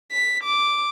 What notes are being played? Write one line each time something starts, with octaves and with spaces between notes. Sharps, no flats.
B6
D6